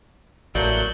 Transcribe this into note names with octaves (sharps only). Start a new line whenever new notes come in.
A1 F#3 A3 A#3 D5 F#6 G6